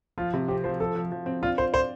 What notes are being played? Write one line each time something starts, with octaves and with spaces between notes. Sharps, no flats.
F3 F4
C3
C4 G4
F3 C5
F3 A4
F3
F3
C4
D4 F4
F4 C5
C5 D5